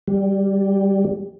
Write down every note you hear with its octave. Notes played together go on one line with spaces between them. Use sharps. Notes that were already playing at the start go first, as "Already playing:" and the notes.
G3